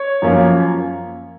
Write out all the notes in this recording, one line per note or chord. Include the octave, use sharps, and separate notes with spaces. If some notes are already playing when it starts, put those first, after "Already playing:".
Already playing: C#5
F#2 F3 A#3 C#4